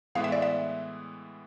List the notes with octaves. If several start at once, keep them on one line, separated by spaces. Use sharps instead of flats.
A2 E3 G#3 B3 E4 F5
E5
D5
E5